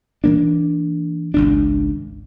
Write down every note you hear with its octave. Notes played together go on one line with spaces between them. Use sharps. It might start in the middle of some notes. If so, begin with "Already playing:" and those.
E3 A#3 D4
G#1 C#2 D4